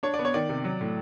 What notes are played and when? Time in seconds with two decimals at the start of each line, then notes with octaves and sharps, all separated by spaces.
0.03 D4 C#5
0.14 D5
0.19 B3
0.25 C#5
0.34 D#3 D5
0.49 C3
0.64 F#3
0.81 A2